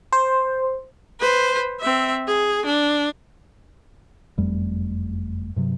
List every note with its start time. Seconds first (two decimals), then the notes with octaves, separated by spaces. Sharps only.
0.13 C5
1.21 B4 C5
1.81 C4 E5
2.27 G#4
2.66 D4
4.38 F#1 F2 G3 A3
5.56 G2 C3 F#3